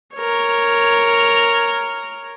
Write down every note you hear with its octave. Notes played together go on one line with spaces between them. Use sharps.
A#4 C#5